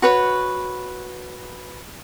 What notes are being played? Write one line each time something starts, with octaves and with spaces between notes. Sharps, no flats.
F#4 B4 C#5